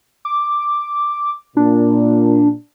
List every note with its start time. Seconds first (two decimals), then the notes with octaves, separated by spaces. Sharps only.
0.25 D6
1.57 A#2 D4